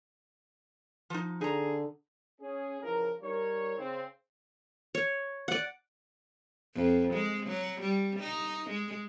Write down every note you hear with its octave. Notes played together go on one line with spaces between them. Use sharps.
F3 D#4
D3 D#4 G#4 A#5
C#4 G#4
C#3 E3 F3 A#4
G3 D#4 A#4 C#5
C#3 C4
C#5
D5 F#5
F2
G#3
F#3
G3
D#4
G#3